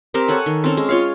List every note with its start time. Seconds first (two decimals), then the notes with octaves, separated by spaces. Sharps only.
0.14 C4 G4 A#4 C5
0.28 A4 C#5 F#5 G#5
0.46 D#3
0.64 C4 C#4 A4
0.77 G#3
0.89 F4 C#5 F5